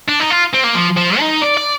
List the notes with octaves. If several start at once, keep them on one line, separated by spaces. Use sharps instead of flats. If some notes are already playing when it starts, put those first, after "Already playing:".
D4
D#4
F4
C4
A#3
F3
F3
D#4
D5
D5